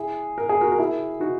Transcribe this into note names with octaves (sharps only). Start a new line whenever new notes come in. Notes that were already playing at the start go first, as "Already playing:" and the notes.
Already playing: E4 G#4
A#4
G#4
F#4 A#4
A#4
E4 G#4
D#4 F#4